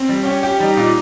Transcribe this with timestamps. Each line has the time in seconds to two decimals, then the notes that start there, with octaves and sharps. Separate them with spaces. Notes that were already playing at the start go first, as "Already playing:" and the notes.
Already playing: C4
0.09 G3
0.25 C#4 G4
0.43 G4
0.60 G3 D#4
0.77 A#2